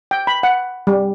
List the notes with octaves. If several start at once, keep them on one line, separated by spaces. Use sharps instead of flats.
G5
B5
F#5
G3